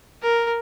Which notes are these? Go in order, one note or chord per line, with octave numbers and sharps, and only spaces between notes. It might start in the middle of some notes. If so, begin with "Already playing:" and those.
A#4